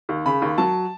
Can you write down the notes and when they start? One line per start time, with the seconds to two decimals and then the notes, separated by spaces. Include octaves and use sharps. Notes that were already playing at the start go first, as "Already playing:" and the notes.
0.09 D#2
0.26 C#3 B5
0.42 D#2
0.58 F#3 A5